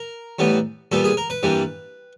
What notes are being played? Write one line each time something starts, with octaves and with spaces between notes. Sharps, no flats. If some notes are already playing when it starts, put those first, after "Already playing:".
Already playing: A#4
A2 E3 G3 B3
A#2 G3 B3 A4
G#4
A#4
B4
G2 E3 G3 A#3